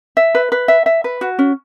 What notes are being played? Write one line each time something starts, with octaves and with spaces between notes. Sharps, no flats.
E5
B4
B4
E5
E5
B4
F#4
C#4